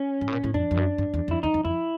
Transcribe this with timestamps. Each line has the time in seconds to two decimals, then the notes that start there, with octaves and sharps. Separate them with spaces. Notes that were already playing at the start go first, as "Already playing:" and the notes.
Already playing: C#4
0.21 G#2
0.28 A2
0.32 A#2
0.44 A2
0.54 F2 D4
0.71 F2
0.77 F#2
0.98 G2
1.14 E2
1.28 F2
1.31 E4
1.43 E2 D#4
1.54 F2
1.65 F2 E4